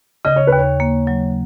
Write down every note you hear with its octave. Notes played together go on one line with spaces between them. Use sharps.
C#3 D#5
C#5
B4
D#2
C#5
A#3
F#3